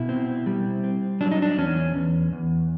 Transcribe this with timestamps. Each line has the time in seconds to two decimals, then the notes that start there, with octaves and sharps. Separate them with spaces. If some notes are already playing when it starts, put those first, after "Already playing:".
Already playing: B2 E4
0.09 C4
0.46 G3
0.84 C4
1.21 F#3 D4
1.32 D#4
1.42 D4
1.58 E2 C#4
1.95 E2
2.33 E2